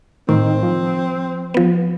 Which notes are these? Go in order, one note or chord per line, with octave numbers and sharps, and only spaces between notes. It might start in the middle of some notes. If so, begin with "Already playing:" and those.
A2 D#3 C4
F3
F3 B3